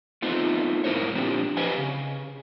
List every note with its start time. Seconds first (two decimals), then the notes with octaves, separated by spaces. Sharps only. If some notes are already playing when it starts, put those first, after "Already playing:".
0.22 A3 B3 C4 D#4 F4
0.84 G#2 E4 A#4 C5 C#5
1.14 A#2 F3 C4 D4 G4
1.57 G4 B4 C5 D#5 F5 G#5
1.78 C#3